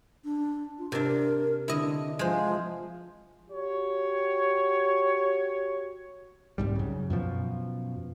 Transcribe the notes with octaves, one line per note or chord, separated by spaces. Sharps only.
D4
F4
C3 D4 A#4
D3 E4 D#5
F3 G#3 C5
F#4 G4 C#5
C2 G#2 G3
F#2 C#3
F#2 B2 F3